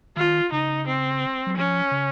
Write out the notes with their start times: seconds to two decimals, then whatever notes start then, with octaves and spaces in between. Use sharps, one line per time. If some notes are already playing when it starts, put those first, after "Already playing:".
0.16 D#3 F4
0.52 C#3 D#4
0.87 C4
1.46 F#3
1.56 F3 C#4
1.91 C#3